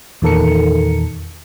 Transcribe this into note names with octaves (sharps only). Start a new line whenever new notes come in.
E2 A#2 D#3 A4 A#4 C#7